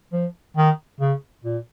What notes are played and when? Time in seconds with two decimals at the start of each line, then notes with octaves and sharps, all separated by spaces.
0.13 F3
0.57 D#3
1.00 C#3
1.44 A#2